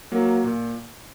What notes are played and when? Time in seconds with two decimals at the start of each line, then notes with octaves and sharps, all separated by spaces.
0.12 F#3 A#3
0.44 A#2